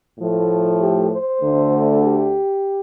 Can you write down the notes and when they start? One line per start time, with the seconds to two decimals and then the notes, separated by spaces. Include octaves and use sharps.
0.19 A2 F3 A3
0.79 G4
1.10 C5
1.41 D2 D3 A3
2.01 G4